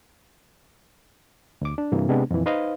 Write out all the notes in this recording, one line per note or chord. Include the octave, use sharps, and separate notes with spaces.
D2 D6
D4
G2 C3 E3 A#3
C3 G#3 B3 D4
F2 A#2 E3
D#4 B4 C5 D#5 F5